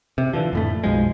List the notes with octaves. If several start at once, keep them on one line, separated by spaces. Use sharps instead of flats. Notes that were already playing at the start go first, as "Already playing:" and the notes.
C3
D3 E3 F3
F2 A2 A3
B1 F#2 F3 G#3